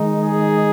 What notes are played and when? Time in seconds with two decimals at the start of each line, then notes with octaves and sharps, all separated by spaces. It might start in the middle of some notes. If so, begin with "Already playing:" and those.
Already playing: D#3 G#3 D#4
0.18 G#4